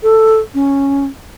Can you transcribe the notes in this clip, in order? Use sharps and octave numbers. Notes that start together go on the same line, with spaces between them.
A4
C#4